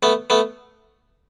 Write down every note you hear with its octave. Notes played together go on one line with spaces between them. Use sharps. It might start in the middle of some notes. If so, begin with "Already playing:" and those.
A3 B3
A3 B3